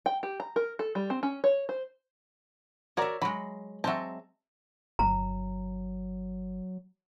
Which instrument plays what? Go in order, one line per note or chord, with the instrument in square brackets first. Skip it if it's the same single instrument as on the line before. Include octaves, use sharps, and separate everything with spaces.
[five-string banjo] G5
G4
A#5
A#4
A4
G3
C4
C#4
C#5
C5
[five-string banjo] F#4 A#4 D5 [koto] C#5 E5
[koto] F#3 G#3 [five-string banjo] B5
[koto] F#3 G#3 C4 [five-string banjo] E5 A5
[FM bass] G1 [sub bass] F#3 [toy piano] A#5